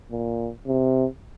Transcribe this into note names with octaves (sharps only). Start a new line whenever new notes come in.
A#2
C3